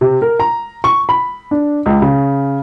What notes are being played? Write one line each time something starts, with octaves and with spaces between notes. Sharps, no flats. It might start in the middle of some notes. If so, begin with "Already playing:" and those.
C3
A#4
A#5
C#6
B5
D4
C#2
C#3